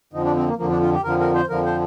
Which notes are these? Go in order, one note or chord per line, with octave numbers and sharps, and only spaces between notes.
F2 D3 F3 D#4
D4
C4
A#3
F2 D3 F3 A#3
D4
F4
G4
F2 D3 F3 A#4
A#4
C5
F2 D3 F3 A#4
C5